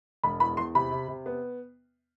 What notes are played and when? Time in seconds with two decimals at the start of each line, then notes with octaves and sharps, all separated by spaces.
0.23 E1 B5
0.40 E2 B5
0.57 E2 C6
0.75 C3 B5
0.91 C3
1.08 C3
1.26 B3